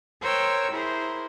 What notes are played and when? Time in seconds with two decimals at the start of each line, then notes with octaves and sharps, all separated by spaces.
0.21 A#4 C5 C#5 G5 E6
0.72 E4 G#4 A#4 C5